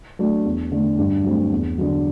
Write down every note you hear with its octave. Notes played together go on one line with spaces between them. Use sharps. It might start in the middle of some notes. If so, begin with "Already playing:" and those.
F#3 A3 D4
E2
D3 A3
G2
F#3 A3 C4
E2
D3 F#3